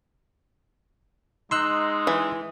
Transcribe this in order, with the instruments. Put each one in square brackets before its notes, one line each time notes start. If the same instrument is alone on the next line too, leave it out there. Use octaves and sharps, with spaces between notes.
[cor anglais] G#3 [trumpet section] D#4 [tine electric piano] C6 E6 F#6
[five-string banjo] E3